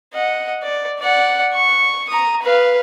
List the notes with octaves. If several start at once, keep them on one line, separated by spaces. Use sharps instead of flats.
D#5 F#5
D5
D5 F#5
C#6
A#5 D#6
B4 F5